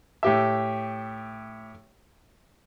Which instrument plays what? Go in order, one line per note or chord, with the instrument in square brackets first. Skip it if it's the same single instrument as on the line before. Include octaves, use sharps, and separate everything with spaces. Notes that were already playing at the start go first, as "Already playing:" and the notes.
[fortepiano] A2 G4 E5